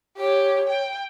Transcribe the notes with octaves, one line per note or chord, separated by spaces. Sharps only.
G4 C#5
G5